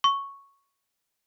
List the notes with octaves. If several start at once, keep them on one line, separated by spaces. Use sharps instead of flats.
C#6